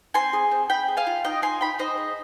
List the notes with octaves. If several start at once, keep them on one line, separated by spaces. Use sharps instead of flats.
C4 G#5 C6
G#4
C4
C4 G5 B5
G#4
F5 G#5
F4
D#4 D#5 G5
D#4 G#5 C6
D#4 G5 B5
D#4 C5 D#5
G#4